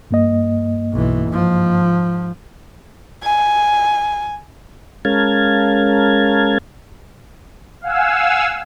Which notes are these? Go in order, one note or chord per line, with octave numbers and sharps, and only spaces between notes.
G2 A#3 D#5
B1 E3
G#2 F3
G#5
G#3 C#4 A#4 F5 A5 G#6
F5 F#5 G#5 E6